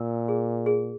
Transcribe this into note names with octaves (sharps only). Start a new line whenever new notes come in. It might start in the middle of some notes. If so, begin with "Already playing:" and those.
Already playing: A#2 A#4
G#4
G#4